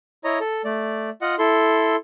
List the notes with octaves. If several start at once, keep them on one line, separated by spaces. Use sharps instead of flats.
E4 C#5 D#5 A#5
A4
A3 D5
F4 D#5 F#5
E4 A4 C6